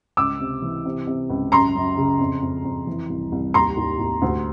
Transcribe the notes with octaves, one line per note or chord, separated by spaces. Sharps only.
C#2 D6 E6
C3
E3
C3
C3
C#2
F#2 A#5 C6
F#2
C#3
F2
F2
F2
E3
C2
C2
D#2 A#5 C6
D#2
D#2
D2